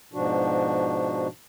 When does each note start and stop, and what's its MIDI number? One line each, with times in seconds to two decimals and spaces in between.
0.13 1.27 44
0.13 1.27 47
0.13 1.27 53
0.13 1.27 62
0.13 1.27 66